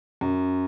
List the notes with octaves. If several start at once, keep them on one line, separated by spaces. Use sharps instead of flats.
F#2